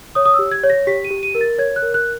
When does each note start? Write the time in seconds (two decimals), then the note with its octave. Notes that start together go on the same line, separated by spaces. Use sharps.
0.15 C#5 D#6
0.25 D#6
0.34 E6
0.39 G4
0.52 G#6
0.64 C#5
0.70 A#6
0.87 G4 B6
1.05 D#7
1.11 G4
1.23 D#7
1.35 A#4
1.41 A6
1.58 C#5 G#6
1.76 F#6
1.82 A#4
1.94 F#6